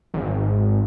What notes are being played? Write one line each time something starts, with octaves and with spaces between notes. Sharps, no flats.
G#1